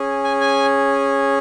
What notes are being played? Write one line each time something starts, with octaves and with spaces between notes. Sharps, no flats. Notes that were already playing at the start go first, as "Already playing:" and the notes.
Already playing: C#4 G#4
G#5
G#5